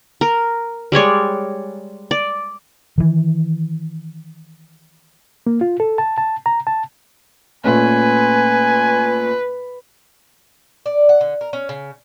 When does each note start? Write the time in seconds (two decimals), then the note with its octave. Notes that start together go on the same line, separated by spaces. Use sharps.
0.21 A#4
0.92 G3 G#3 C#5 D5
2.11 D5
2.98 D#3 E3
5.47 A#3
5.61 F4
5.80 A4
5.98 A5
6.18 A5
6.46 A#5
6.67 A5
7.64 A#2 A3 C#4 B4 G#5
10.86 D5
11.09 F#5
11.21 D3
11.41 A#4
11.53 C#4
11.69 C#3